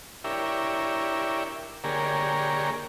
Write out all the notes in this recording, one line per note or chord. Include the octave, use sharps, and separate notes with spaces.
D4 E4 G4 A#4 C#5 E5
D3 A#3 G4 G#4 A#4 C#5